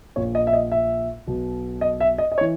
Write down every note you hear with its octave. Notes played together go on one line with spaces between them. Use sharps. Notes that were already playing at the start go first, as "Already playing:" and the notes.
A#1 A#2 C#5
D#5
E5
D#5
E5
B1 B2
D#5
E5
D#5
D#5
C#5
E3